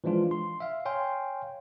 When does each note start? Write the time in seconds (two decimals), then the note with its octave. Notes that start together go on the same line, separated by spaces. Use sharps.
0.04 E3 F3 G#3 D4 F4
0.31 C6
0.60 E5 F5
0.86 C#5 F5 G5 G#5 C6